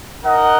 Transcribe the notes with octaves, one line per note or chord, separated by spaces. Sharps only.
D#4 A#4 D#5 F#5